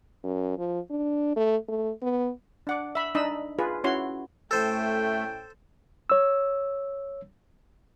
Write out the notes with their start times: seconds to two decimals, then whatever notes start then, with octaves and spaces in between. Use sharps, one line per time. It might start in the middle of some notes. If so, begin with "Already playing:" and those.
0.24 F#2
0.58 F3
0.90 D4
1.36 A3
1.68 A3
2.02 B3
2.67 D4 F#5 D6
2.95 E5 B5
3.15 D4 D#4 D#5 B5 E6
3.58 F4 G#4 B4
3.84 C#4 E4 F#4 C#5 C6
4.51 A2 A3 C#4 A4 C5 G5
6.10 C#5 E6